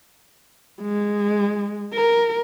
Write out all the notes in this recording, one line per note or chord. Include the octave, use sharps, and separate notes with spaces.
G#3
A#4